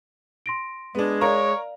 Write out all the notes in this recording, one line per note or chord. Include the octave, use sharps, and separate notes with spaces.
C6 A#6 D7
G#3 B3 D4
A#4 C#5 D5 F5 A#5